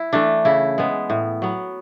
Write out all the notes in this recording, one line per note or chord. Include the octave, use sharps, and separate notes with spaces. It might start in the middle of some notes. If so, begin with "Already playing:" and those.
Already playing: E4
E3 A3 D4
C#3 E4
G#3 B3
A2
F#3 B3